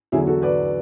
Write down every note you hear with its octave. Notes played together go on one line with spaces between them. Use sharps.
E2 D3 F#3 E4 G#4
F#4 A4
B4 D5